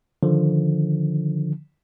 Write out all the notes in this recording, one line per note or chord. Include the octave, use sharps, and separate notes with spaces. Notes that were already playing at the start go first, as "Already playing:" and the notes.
D3 D#3 F3